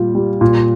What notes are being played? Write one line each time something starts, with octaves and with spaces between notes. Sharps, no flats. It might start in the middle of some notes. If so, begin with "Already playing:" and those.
Already playing: A#2 G3 F4
G3
A#2